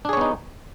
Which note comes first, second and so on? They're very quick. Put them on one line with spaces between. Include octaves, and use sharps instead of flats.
D4 G#4 C#5 B3 D#4